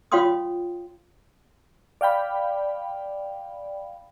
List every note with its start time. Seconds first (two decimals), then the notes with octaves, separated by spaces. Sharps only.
0.12 F4 C#5 F5 G5 C6 D#6
2.01 D5 F5 G5 B5